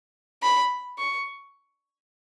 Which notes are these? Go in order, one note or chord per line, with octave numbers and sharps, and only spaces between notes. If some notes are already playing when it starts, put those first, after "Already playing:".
B5
C#6